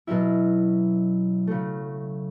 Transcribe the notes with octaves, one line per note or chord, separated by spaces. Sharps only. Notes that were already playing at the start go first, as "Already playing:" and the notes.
B2 F#3 C#4 E4
C#3 F#3 A3